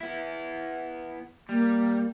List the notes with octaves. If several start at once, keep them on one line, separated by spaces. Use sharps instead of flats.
B3 E4
G3 A#3